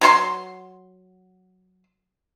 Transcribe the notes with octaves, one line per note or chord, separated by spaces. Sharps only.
F#3 B4 C6